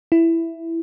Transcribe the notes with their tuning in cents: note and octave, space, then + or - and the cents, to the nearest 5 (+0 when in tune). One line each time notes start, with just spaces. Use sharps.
E4 +5